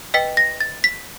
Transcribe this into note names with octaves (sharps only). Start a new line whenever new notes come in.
B4 D#5 G5 B6
A#6
A6
B6